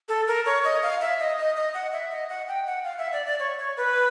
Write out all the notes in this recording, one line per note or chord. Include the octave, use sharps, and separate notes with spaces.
A4
A#4
C#5
D#5
F5
E5
D#5
D#5
D#5
F#5
E5
D#5
F#5
G5
F#5
F5
E5
D5
D5
C#5
C#5
B4